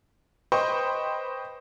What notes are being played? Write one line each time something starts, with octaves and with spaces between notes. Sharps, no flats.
B4 C5 D#5 G5 C#6